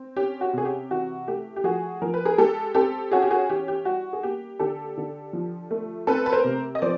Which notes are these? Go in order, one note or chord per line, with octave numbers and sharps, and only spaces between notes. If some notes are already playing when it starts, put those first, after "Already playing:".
Already playing: C4
C#4 G4
F#4
C3 G#4
G4
E3 F#4
A3 G4
G4
F3 F#4 G#4
F3 A#4
B4
G#4 A#4
G#3 G4 A4
C4 G4 A4
C#4 F#4 G#4
G4
F#4 G#4
E3 G4
G4
G3 F#4
G#4
A#3 G4
D3 G4 A4
D3
F3
A3
C4 A4 B4
B4
A#4 C5
C3
D#5
F3 C5 D5